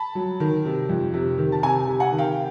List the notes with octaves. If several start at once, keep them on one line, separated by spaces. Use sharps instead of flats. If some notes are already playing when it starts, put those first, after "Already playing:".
Already playing: A5 B5
F#3
D#3
C3
F2
C3
D#3
A5
C3 G#5 A#5
C3
F#5 G#5
D#3
F5 G5